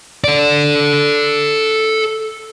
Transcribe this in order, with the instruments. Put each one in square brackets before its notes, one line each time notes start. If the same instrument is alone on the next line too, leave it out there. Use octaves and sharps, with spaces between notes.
[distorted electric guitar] A4 D5